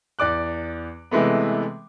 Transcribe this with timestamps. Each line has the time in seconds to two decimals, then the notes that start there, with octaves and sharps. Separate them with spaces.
0.19 E2 D5 D6 F#6
1.11 C3 E3 G#3 A3 B3